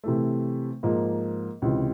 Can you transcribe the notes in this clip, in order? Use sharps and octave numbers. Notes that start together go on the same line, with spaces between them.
C3 E3 A3
G#2 F3 A#3
C#2 C3 E3